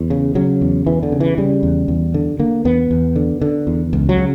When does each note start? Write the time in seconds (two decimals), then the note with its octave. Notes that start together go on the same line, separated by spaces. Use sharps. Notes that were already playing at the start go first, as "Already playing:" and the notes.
Already playing: E2
0.10 C#3
0.35 C#3 F#3
0.61 E2
0.87 E2 E3
1.03 D3
1.12 C#3
1.20 E3
1.38 C#3 G3
1.63 E2
1.88 E2
2.14 D3
2.39 D3 A#3
2.65 E2 B3
2.91 E2
3.16 D3
3.42 D3
3.67 E2
3.93 C#2
4.09 F#3
4.18 C#3